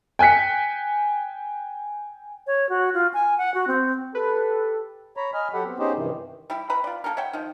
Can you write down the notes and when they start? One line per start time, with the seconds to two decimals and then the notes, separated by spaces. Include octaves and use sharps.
0.19 G5 G#5 F#6 B6 C#7
2.47 C#5
2.69 F#4
2.94 F4
3.14 G#5
3.38 F#5
3.54 F#4
3.67 C4
4.15 G4 A4 B4
5.17 C#5 A#5 B5
5.34 D#5 G#5 B5 F6
5.54 F#3 G4 A4 F#5 B5
5.66 B3 C4
5.79 B3 C#4 D#4 G4 G#4 C5
5.96 G2 C3 D#3 E3
6.50 G3 E4 G4
6.70 B4 A#5 B5
6.84 F4 D5
7.04 A#3 G4 A4 A#4
7.17 C#5 E5 F#5 G5
7.33 D#3 F3